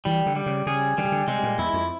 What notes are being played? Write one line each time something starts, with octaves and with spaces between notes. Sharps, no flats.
E3 G3
D3
G3
C#3
C#3 G#4
D3 G3
C#3
D3
C3 G#3
A#2
E2 E4
F2